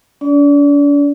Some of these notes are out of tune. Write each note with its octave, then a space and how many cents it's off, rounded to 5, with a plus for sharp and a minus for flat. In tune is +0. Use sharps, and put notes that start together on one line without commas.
D4 -45 D5 -25